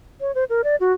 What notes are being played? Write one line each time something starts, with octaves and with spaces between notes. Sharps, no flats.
C#5
C5
A#4
D5
F#4